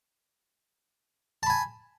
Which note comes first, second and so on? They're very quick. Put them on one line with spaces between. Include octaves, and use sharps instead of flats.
A5 B5 G#5